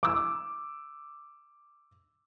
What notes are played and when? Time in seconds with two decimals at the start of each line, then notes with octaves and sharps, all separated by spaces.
0.03 D6 E6